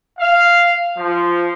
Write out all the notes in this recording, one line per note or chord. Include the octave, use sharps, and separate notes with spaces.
F5
F3